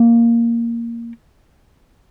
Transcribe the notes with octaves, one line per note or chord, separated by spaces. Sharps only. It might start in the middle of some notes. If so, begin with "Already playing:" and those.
Already playing: A#3